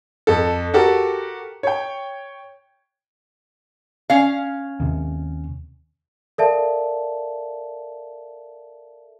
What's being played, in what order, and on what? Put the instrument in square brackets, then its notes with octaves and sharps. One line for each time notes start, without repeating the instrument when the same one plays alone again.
[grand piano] F2 A4
F#4 G4 A4 A#4
C#5 G5
[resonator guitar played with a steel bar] C#4 F5
[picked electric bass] D#2 C3
[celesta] A4 A#4 D5 E5 F5 A5